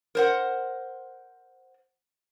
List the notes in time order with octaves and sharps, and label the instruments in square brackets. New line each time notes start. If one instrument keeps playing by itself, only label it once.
[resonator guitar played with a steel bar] A#4 C5 F#5